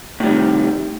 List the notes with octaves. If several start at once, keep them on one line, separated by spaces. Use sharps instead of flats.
A2 C3 D#3 G3